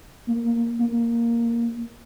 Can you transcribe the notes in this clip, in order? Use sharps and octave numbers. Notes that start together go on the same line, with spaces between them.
A#3
A#3